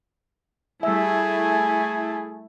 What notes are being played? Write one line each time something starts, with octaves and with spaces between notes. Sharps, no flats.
G3 A3 E4 G#4 E5 G#5